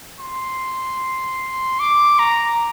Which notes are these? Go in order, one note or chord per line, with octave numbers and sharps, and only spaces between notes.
C6
D6
A#5